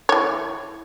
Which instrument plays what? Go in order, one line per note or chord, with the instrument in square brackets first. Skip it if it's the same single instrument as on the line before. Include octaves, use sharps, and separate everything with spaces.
[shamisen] E3 C#5